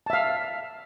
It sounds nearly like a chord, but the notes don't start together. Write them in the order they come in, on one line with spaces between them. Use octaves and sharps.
A5 E5 F5